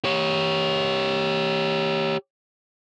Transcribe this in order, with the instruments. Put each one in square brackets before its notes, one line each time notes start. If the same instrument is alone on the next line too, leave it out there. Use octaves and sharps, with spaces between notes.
[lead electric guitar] G4 C#5